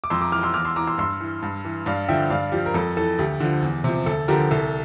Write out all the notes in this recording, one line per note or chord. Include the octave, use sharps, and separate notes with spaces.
D6
F2 C6 E6
A#5 D6
E3 D6 F6
C6 E6
E2 D6 F6
C6 E6
E3 A#5 D6
C6 E6
G2 C6 E6
E3
G2
E3
G2 D5 F5
D3 F3 E5 G5
G2 D5 F5
F3 G4
A#4
F2 A4
E3 A4
D2 G4
D3 F3
E2
C3 F3
D2 A4
D3 F3 G4 A#4
C2 A4